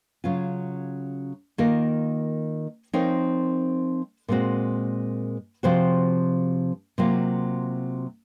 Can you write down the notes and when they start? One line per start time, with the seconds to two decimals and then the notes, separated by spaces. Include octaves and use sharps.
0.24 C#3 F#3 C#4 F4
1.58 D#3 A#3 F4 A#4
2.93 F3 C4 D#4 A#4 C#5
4.28 A#2 G#3 C4 F#4
5.63 C3 F3 C4 F#4 C5
6.98 C3 F#3 A#3 F4